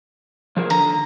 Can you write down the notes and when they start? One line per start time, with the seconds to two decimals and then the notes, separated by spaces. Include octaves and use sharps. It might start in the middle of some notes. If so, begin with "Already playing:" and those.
0.57 F3 G#4 A#4
0.70 D3 A#5